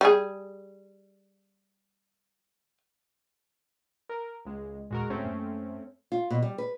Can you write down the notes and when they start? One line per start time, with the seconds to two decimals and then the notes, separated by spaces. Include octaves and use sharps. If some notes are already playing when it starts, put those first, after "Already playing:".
0.01 G3 G#4
4.09 A#4
4.45 C#2 G#3
4.91 D#2 A#2 G#3 F#4 A#4
5.10 D1 A3 C4 C#4
5.25 F#2 A#3
6.12 F4
6.30 B2
6.42 G3
6.58 B4